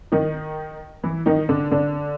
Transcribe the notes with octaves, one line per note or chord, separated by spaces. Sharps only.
D#3 D#4
E3 E4
D#3 D#4
D3 D4
D3 D4